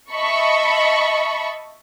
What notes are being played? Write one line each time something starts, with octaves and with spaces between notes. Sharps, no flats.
D#5 E5 A5 B5 C#6